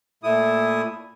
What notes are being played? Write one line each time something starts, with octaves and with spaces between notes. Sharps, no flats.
A#2 A3 E4 D#6